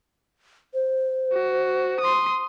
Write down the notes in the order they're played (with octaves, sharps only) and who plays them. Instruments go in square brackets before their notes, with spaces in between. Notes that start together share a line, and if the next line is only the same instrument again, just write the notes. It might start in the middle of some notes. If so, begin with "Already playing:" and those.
[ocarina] C5
[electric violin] F#4
C6 D#6